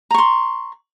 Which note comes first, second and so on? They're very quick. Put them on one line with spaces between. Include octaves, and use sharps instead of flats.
A#5 C#6 C6